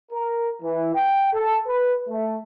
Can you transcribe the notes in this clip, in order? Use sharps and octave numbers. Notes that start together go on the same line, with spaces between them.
A#4
E3
G5
A4
B4
A3